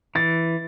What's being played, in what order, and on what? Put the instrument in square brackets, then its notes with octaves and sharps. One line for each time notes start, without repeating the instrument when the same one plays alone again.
[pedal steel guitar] E3 [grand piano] A6